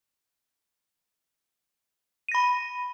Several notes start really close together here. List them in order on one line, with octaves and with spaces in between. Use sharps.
D#7 A#6 B5